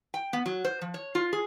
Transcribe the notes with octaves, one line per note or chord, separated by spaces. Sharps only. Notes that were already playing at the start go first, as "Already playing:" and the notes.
G5
B3
F#3
C5
F3
C#5
F4
G#4